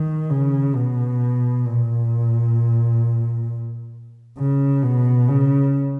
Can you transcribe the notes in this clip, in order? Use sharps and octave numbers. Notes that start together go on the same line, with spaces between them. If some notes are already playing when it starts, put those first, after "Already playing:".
Already playing: D#3
C#3
B2
A#2
C#3
B2
C#3